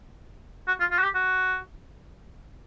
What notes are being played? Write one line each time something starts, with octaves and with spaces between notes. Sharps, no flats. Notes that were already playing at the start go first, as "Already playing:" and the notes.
F#4
F4
F4
F#4
G4
F#4